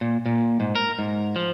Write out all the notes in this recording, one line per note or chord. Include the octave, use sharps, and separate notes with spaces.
A#2
A#2
G#2
A#4
G#2
F3